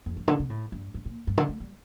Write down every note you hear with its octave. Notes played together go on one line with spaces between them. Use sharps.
F2
G2
D3
C3
A2
G2
G2
A#2
G2
D3
A3
G3